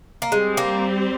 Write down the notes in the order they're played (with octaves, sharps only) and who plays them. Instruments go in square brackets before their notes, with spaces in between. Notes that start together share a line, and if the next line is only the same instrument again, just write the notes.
[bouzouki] A#3
[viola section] G3 C4 G4 C5 [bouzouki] G#3
[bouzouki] A#3